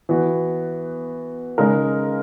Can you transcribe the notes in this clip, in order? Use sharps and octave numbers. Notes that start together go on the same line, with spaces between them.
E3 B3 F#4
C#3 G#3 D#4 A#4